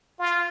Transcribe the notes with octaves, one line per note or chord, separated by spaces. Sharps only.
F4